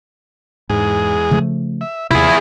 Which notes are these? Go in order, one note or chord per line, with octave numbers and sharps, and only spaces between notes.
E2 G#2 G#3 G#4
C#3 F3 A3
E5
D#2 C3 F3 E4 G#4